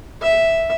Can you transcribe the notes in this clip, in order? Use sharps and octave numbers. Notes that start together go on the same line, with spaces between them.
E5